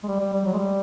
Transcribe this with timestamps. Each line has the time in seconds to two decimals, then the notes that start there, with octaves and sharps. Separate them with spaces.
0.03 G#3
0.08 G3
0.20 G3
0.33 G3
0.45 F#3
0.53 G#3
0.58 G3